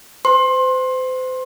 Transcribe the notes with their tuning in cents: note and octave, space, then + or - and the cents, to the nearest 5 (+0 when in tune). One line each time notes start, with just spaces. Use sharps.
C5 -35 C6 +25